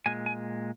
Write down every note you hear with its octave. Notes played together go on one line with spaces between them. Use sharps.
A#2 G#3 G#5
G#5